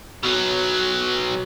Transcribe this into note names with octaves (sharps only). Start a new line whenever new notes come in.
B2 F#3